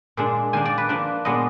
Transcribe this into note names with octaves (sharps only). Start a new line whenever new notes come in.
A#2 G#3 D4
D#3 A#3 D4 G#5
D5
B4
F3 A#3 D4
A#2 G#3 B3 D4 D#5